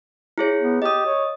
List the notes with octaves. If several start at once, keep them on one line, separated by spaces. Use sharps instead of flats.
E4 G#4 C#5
B3
G4 D#5 D#6
C#5